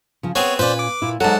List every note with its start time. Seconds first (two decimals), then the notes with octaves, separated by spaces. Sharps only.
0.23 C#3 F3
0.35 B3 C4 G#4 C#5 F5 F#5
0.59 A#2 C#4 F4 B4 C5 D5 B5
0.79 D6
1.02 A#2 E4
1.21 G#2 F#3 A4 D5 F#5 A5